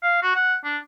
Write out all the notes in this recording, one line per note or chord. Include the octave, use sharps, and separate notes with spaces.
F5
F#4
F#5
D4